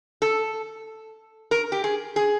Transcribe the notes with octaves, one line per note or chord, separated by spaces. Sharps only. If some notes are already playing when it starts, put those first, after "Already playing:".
A4
A#4
G4
G#4
G#4